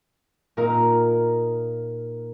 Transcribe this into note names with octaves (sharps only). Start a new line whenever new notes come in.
A#2 A#3 D#4 A#4